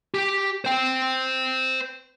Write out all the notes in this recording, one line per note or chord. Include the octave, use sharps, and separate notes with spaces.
G4
C5 G5